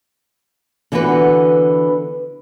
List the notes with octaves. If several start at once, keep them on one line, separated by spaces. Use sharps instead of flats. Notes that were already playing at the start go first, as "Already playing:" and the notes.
D3 E3 B3 F#4 B4 F#5